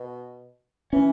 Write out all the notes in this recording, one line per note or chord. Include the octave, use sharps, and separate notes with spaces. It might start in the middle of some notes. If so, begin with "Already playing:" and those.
Already playing: B2
E3 C#4